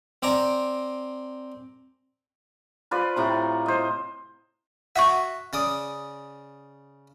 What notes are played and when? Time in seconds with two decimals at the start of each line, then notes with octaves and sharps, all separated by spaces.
0.23 C4 D5 G#5 A#5
2.91 F4 B4 C5 D5
3.16 A2 C3 A#5
3.66 C5 D#5
4.96 F#4 E5 F#5 C#6
5.53 C#3 D5 D#6